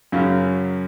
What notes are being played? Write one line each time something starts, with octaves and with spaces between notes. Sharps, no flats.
F#2 C#3 F#3